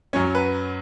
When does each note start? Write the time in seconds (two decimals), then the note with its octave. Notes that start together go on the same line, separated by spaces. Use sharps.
0.13 F#2 F#3 C#4 C#5
0.35 B4